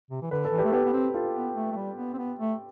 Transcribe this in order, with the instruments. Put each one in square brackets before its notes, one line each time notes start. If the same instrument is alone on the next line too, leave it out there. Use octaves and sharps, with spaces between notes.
[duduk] C3
E3
[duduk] D3 [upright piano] B4
[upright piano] A4
[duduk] E3
[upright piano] G4 B4
[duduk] A3 [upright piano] A4
[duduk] B3 [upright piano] G4 B4
[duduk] B3
C4
[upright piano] F4 A4
[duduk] B3
A3
A3
G3
B3
C4
B3
A3